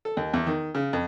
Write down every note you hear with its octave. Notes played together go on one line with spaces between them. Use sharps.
A4
D#2
E2
D#3
C#3
F2